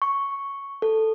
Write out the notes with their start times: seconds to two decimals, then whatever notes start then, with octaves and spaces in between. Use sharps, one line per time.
0.02 C#6
0.82 A4